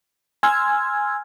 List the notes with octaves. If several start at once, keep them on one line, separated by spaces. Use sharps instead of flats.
G#5 C6 E6 F6 G#6